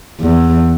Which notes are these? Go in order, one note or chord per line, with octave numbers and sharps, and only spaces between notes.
E2